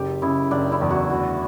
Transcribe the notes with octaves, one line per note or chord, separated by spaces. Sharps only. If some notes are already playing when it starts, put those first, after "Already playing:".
Already playing: F#1 G4
C#3 E4
F#1 D4
E4
E2
F#4
D2 F#4